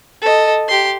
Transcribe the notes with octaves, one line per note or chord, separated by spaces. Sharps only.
A4 D#5
G4 C6